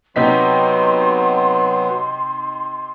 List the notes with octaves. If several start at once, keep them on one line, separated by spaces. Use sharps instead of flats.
C3 F#3 B3 D#4 C6 B6